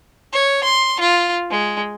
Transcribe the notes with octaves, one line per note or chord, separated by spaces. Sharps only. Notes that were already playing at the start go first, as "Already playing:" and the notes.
C#5
C6
F4
G#3